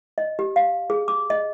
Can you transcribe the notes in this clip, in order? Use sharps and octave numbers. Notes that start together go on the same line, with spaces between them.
D#5
G4
F5
G#4
D6
D#5